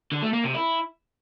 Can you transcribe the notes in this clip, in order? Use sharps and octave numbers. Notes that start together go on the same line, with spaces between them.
D3
A3
A#3
C3
E4